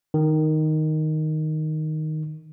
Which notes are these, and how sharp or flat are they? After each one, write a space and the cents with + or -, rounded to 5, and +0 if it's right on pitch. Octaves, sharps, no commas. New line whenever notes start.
D#3 +0